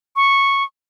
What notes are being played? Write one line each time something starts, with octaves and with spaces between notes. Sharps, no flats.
C#6